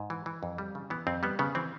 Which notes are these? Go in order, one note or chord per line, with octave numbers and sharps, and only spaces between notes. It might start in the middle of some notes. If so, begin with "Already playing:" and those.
Already playing: G#2
E3
E3
F2
G3
C#3
E3 B3
F2 C4
G3 B3
C#3 B3
E3 C4